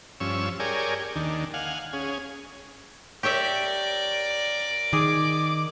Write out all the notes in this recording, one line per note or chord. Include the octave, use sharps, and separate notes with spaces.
G2 F3 C#4 C#6 E6
G4 G#4 A#4 C#5 D5 G#5
D#2 D#3 D4
F5 F#5 G#5
C#4 G#4
G4 A#4 C#5 D5 E5
D#3 G#4 D6